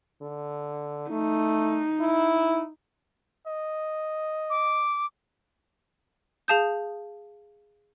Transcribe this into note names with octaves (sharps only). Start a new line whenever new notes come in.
D3
A3 D#4
E4
D#5
D6
G#4 F5 A5 D#6 G6